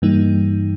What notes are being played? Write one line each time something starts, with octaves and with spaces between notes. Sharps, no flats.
G2 E3 G3 A#3 D#4